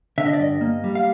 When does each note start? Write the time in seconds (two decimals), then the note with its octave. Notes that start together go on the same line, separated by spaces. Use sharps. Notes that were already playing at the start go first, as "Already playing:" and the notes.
0.18 D3 E5
0.26 D#5
0.33 D5
0.40 G2 D#5
0.61 A#3
0.84 G3
0.95 F5